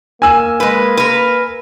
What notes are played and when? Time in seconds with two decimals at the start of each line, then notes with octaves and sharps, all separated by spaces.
0.22 A#3 G#5 E6
0.60 G#3 B4
0.97 A#4 B4